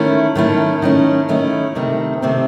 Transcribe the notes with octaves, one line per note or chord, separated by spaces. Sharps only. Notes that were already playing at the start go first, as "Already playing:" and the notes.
Already playing: D#3 A3 C#4 E4
D#3 A3 C#4 E4
D#3 A3 C#4 E4
D#3 A3 C#4 E4
C3 D#3 A3 C4
C3 D#3 A3 C4